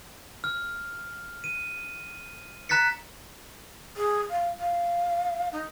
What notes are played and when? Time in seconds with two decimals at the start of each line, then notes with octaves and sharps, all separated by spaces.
0.44 F6
1.44 D#7
2.69 A#5 F#6 A6 B6 C#7
3.97 G#4
4.30 F5
4.60 F5
5.52 D#4